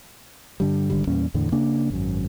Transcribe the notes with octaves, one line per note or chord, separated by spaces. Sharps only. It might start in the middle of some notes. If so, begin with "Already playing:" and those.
G2 D3 G3
G#1 D3 G3
E2 A#2 G3 C#4
E2 A2 D3
C#3 A#3 D4
G#1 F#2